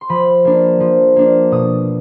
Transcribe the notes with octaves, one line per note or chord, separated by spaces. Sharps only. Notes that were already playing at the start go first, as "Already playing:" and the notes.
C6
F3 B5
A#3 D4
F3
A#3 D4
B2 D#6